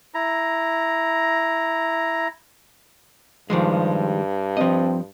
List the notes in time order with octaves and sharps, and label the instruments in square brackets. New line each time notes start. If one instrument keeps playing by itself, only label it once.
[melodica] E4 A#5
[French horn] G2 [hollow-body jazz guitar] D#3 G3 G#3 [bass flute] F3
[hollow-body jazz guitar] F3 D#5 [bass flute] C4